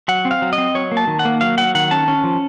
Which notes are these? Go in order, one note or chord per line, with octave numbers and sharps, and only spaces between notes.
F#3 F#5
C4
F5
F#3
D#5
C4
F#3 C#5
A#3
A5
D#3
F#5
A#3
F#3 F5
F#3 F#5
D#3 F#5
C#4 A5
C#4
F3